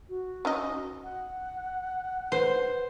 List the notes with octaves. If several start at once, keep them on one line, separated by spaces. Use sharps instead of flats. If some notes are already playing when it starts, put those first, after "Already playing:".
F#4
C#4 D#4 D#5
F#5
B4 C5